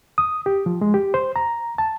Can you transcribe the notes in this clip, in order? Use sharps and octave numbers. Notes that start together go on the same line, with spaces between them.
D#6
G4
F3
G#3
G4
C5
A#5
A5